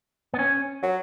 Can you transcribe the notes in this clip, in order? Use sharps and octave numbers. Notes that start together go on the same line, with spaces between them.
B3
C#4
F#3